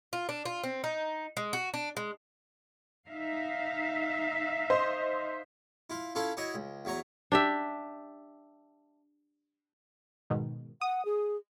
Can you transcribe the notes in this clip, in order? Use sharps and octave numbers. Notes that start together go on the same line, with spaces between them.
F4
D4
F4
C4
D#4
G#3
F#4
D4
G#3
D#4 E5 F5
C5 D#5 C6
E4 F4
C#4 E4 F4 A4 C#5
E4 F#4 C#5 D#5
C#2
E2 F#3 C#5 A#5
D4 G4 E5
G#2 B2 D#3
F#5 D#6
G#4